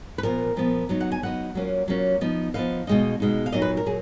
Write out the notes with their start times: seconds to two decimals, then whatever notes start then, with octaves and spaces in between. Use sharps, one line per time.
0.18 B4
0.23 A#2 F3 B3 F4 A#4
0.56 A#2 F3 B3 F4
0.89 F#3 B3 D#4
1.00 F#5
1.12 G#5
1.23 F#3 B3 D#4 F#5
1.55 F#3 A#3 C#4 F4
1.88 F#3 A#3 C#4 F4
2.21 F3 B3 D#4
2.54 F3 B3 D#4 F5
2.87 B2 G#3 D#4
3.20 B2 G#3 D#4
3.46 F5
3.52 A#2 F#3 A#3 D#4 D#5
3.62 B4
3.77 A#4
3.86 A#2 F#3 G#4